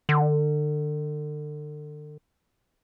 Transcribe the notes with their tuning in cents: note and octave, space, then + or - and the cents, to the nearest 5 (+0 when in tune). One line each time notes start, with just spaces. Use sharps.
D3 +35